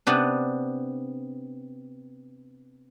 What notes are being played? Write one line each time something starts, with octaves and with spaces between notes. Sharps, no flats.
C3 B3 D4